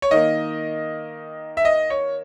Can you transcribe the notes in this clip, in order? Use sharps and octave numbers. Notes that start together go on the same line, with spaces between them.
C#5
D#3 A#3 D#5
E5
D#5
C#5